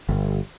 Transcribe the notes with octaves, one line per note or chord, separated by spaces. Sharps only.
G1